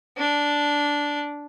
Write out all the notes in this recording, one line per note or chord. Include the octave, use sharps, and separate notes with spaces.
D4